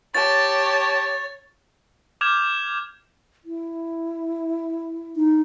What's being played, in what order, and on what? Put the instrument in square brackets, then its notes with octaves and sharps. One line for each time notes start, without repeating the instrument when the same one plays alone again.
[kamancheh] G4 A5 [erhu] C#5 [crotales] A6
[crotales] D6 F6 G6 G#6 E7 F7
[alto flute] E4
[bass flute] D#4